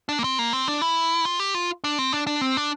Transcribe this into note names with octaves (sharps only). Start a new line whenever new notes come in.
D4
A#3
C4
A#3
C4
D4
E4
F4
G4
F4
D4
C4
D4
D4
C4
D4